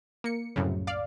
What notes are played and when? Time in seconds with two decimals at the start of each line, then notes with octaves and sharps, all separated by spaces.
0.24 A#3 C#7
0.56 C2 F#2 A2 C#3
0.87 D5 F5